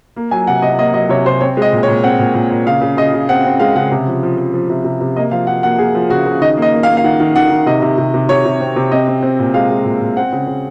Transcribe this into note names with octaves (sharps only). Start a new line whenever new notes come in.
A#3
F#3 G#5
C3 F#5
C3 D#5
A#3 D#5
F#3 D#5
C3 C#5
C3 C5
C4 C#5
G#3 D#5
A#2
C#5
A#2
C4 F#5
A#2
A#2
A#2
C#3 F5
C#3
C#3 D#5
C#3
C4 F#5
C4
G#3 F5
C#3 F#5
C3
F3
F3
F3
F3
C3
C3
C3
A#3 D#5
F3 F5
F3 F#5
A#3 F#5
A#3 G#4
F3
C#3 F#4
C#3
D#3 D#5
A#3
D#5
A#3
F5
A#3
F5
D#3 F#5
D#3
D#3 F#5
D#3
C3 D#5
C3
C3
C3
C3 C#5
C3
C4
C3
C4 D#5
C4
C4
A#2
G#3 F5
G#3
A#2
A#2
C4 F#5
C#3
C#3